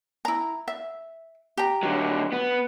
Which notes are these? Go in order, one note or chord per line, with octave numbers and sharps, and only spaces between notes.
E4 A#5
E5
G4 A#5
D3 F#3
B3